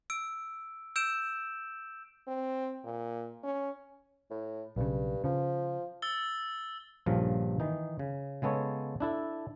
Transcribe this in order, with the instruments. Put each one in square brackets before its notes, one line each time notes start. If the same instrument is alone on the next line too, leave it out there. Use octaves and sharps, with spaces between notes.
[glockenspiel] E6 D7
E6 G6 D7 E7
[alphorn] C4
A#2
C#4
[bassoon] A2
[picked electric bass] B1 C#3 [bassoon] G2
[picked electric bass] C#3 [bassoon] F3
[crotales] E6 A6 G7
[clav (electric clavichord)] A#1 G2 C#3 F3 A#4 A#5
D#3 E3 D#4
C#3
C#3 G#3 B3 A4 C#5
D4 E4 A4